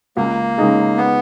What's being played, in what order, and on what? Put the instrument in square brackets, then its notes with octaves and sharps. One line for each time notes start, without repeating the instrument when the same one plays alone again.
[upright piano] C#2 [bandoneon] A#3
[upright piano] C#3 G#3 D#4 G#4
[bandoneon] B3